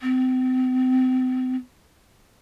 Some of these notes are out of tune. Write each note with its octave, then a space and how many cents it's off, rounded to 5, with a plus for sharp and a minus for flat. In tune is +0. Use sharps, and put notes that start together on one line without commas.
C4 -35